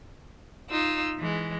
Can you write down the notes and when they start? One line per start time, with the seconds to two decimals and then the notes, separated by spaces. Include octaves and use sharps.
0.70 D#4 F4 E6
1.19 E3 G#3